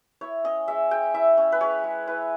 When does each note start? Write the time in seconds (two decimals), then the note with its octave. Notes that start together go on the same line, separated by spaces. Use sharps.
0.21 E4 C#5
0.44 C#4 D#5
0.68 G#3 E5
0.91 G#3 G5
1.14 E4 E5
1.37 C#4
1.52 B4
1.61 G#3 C#5
1.84 G#3
2.07 E4 B4